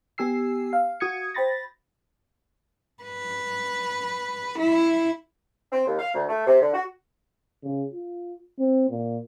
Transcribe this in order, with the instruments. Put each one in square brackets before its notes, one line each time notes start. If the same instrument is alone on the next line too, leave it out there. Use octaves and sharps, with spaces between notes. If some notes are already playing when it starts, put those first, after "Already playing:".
[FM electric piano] B3 G4 G#5 E6 C7
F5
F#4 D#6 G#6 C#7
C5 G5 B5 A6 A#6
[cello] B4
E4
[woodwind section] C4
D#2
F5
D2
A3
C3
D3
F#4
[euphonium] C#3
F4
C4
A#2